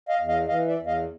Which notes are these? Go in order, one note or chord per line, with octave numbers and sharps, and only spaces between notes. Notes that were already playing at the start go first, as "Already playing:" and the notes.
D#5 F5
E2
D#5 F5
E3 D#5 F5
D5 E5
E2
D#5 F5